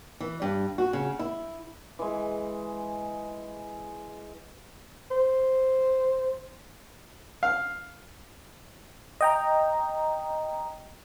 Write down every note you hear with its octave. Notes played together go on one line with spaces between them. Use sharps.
E3
G2
F#4
C#3
E4
E3 G#3
C5
F5
D#5 G5 A#5